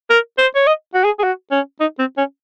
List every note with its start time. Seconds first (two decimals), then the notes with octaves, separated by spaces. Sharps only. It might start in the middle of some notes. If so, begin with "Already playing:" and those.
0.10 A#4
0.38 C5
0.55 C#5
0.67 D#5
0.95 F#4
1.05 G#4
1.19 G#4
1.24 F#4
1.51 C#4
1.80 D#4
1.99 C4
2.18 C#4